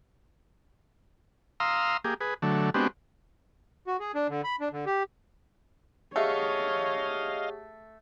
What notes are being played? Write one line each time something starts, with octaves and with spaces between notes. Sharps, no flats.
F5 A#5 C6 D#6 E6
A#3 G4 G#4
G#4 B4
D3 F#3 A3
G#3 B3 C4 D4 F#4 G4
F#4
G#4
D4
D3
B5
D4
D3
G4
A3 G4 G#4 C#5 D#5 F5 F#5